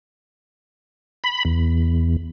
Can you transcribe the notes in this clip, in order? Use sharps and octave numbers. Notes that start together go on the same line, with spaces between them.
B5
E2